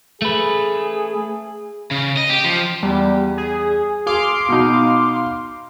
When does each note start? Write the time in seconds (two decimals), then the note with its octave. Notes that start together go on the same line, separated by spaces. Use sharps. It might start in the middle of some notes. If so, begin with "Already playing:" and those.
0.22 A3 G#4 B4
1.91 C#3
2.17 D#5
2.30 G4
2.44 F3
2.83 E2 G3
3.37 G#4
4.06 G#4 F5 C6 D6
4.49 B2 D#4